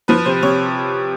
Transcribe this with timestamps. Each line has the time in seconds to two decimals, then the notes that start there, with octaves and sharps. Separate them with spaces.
0.08 F3 B4
0.25 C3 C5
0.42 C3 C#5